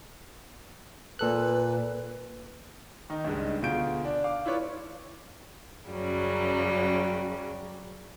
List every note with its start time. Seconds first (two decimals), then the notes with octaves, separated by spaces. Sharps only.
1.19 A#2 A4 B4 F#6
3.10 D#3 D#4
3.25 C#2 G2 G#3
3.62 D2 B2 F4 G#4 G6 D7
4.05 D4
4.24 F5 D6
4.46 E4 F4 B4 C#5 D5
5.88 F#2 C#3 F#3 G3